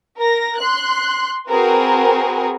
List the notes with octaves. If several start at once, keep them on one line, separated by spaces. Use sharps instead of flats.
A#4 A#6
C6 F#6
C4 F#4 G#4 A#4 B4